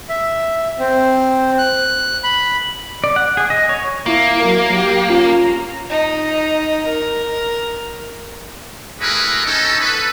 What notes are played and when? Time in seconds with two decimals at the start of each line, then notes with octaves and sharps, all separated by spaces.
0.09 E5
0.79 C4
1.58 F#6
2.24 B5
3.04 D5
3.16 F#5
3.37 G#4
3.50 D#5
3.69 C#5
4.06 A#3 E4
4.39 F#3 A#4
4.75 G4
5.09 C#4 F4 A#5
5.90 D#4
6.86 A#4
9.01 A3 E4 F#4 G#4 A#4 B4
9.46 C#4 D#4 A4
9.81 A4 B4